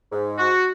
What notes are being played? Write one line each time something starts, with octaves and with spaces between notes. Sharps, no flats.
G#2
F#4